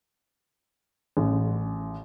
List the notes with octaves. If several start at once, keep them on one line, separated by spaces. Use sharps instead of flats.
A1